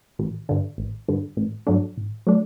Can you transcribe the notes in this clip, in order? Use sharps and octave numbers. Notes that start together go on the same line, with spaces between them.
A1
G2 D3
A1
G2 D3
A1
G2 F#3 A3 D4
A1
F#3 A3 D4